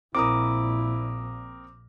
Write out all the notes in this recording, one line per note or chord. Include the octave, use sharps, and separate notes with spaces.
A#1 A#2 C4 E4 A#4 D6 D#6